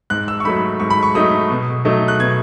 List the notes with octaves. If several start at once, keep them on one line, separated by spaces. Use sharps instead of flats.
G#2 F#6
E6
C#6
F#3 A3 D#4 B5
G#2 C#6
B5
C#6
F#3 A3 D#4 D#6
B2
F#3 A3 D#4
F#6
B2 G#6